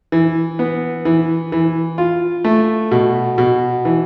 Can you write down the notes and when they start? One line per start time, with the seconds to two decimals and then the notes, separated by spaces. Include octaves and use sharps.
0.12 E3
0.59 B3
1.05 E3
1.52 E3
1.98 F4
2.44 A3
2.91 B2
3.38 B2
3.85 E3